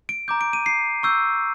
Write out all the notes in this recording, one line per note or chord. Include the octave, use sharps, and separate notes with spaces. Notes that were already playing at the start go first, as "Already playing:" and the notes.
D7
A#5 D6 G6
D7
D#7
C7
C#6 E6 G6